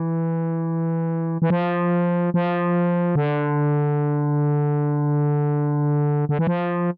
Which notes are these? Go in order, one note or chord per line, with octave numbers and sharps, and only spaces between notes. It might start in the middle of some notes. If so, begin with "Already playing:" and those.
Already playing: E3
E3
F3
F3
D3
D3
E3
F3